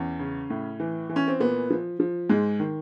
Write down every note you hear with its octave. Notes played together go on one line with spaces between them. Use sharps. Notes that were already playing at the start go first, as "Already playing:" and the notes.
Already playing: E2 C#4
C#3
A2
E3
E3
C#4
C4
A#2 B3
F3
F3
G#2 G#3
D#3